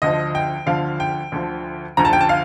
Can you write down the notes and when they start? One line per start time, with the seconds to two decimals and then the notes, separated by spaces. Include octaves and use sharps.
0.02 D2 D3 F3 D#5
0.35 G5
0.66 D2 D3 F3 F5
1.00 G5
1.32 D2 D3 F3
1.97 D2 D3 F3 A#5
2.05 A5
2.13 G5
2.21 A5
2.29 F5